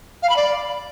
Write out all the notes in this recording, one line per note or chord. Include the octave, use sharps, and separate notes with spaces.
F5
B5
D5